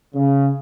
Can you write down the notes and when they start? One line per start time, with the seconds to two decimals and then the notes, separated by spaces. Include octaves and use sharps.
0.14 C#3